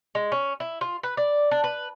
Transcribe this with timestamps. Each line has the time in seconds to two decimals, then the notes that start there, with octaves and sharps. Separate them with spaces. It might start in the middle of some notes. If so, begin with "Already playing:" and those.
0.15 G#3
0.32 C#4
0.60 E4
0.81 F4
1.03 B4
1.17 D5
1.51 D4
1.64 B4